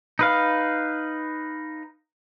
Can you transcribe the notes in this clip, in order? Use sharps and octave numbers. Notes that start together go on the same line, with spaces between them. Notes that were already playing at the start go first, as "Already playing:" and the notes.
D#4 B4 F5